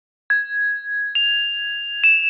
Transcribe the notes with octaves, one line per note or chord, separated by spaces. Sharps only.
G#6
F7
E7